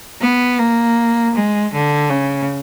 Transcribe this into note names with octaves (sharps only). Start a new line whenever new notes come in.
B3
A#3
G#3
D3
C#3